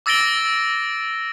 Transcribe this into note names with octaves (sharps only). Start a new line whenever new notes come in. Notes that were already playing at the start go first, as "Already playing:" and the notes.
D6 E6 A6 A#6 D7 G7